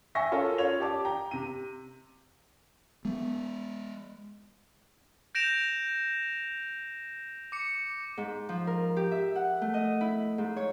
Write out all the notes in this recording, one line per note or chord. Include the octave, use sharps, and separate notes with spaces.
E5 G5 G#5 C#6 A#6
C#4 F4 A4 A#4
F4 C#5 F5 F7
G4 D5 A5 D6
G5 A#5
C3 D#7
G#3 B3
G6 A#6 D7 E7 F7
D6 C#7
G#2
F3
A#4
G4
E5
F#5
A3
D#5
E4
G#2
C#5